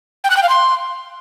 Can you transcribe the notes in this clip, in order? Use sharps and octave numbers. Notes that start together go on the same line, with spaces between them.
G5
F#6
G5
F5
C6